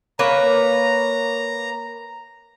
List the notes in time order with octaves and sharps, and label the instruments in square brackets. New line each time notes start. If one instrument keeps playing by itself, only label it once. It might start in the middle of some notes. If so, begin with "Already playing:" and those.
[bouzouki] A#3 B4 C#5 [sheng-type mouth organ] A#5